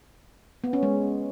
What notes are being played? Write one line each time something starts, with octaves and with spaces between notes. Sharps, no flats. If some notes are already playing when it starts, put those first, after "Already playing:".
B3
C#4
G#3